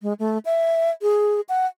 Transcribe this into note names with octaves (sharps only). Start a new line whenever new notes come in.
G#3
A3
E5
G#4
F#5